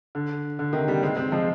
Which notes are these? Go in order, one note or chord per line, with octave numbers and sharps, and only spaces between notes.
D3
D3
C3 D#3
G3 A#3
G#3 C4
G#3 C4
F3 G#3